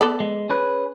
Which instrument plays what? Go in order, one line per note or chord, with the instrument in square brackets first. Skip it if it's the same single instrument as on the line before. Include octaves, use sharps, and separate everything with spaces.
[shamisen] B3 A4 D5
[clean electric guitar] G#3
C#4 G#4 B4